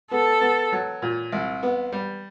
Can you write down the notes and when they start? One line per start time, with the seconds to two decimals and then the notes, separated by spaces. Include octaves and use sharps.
0.11 B3 A4
0.41 B3
0.72 F#3
1.02 A#2
1.32 C2
1.63 B3
1.92 G3